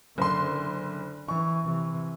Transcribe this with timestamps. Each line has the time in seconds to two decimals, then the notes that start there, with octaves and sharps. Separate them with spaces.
0.18 F#1 D3 C6
1.28 E3 C#6
1.64 C3 E3